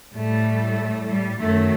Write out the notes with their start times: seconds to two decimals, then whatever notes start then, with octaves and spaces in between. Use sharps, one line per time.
0.15 A2 G3 A3
1.08 G3
1.39 F#2 D#3 F#3 A3